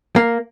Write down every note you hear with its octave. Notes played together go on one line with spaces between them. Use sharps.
A#3